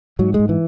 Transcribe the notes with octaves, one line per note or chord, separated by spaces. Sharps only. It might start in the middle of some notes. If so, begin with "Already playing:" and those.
G#2 F#3
G#3
G#2
E3